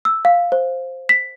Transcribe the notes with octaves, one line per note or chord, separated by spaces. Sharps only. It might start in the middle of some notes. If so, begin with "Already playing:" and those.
E6
F5
C5
B6